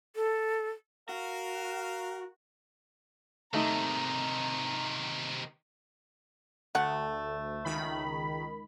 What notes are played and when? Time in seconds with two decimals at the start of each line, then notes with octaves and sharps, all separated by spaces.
0.16 A4
1.09 F#4 A#4 F5
3.54 C3 D#3 A3 D#4 A#5
6.75 D2 A3 F#5
7.65 C#2 D#3 B5